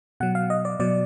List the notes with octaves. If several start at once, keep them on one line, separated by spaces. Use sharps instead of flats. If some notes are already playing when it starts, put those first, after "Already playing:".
B2 F#3 F#5
F5
D#5
D5
B2 F#3 D5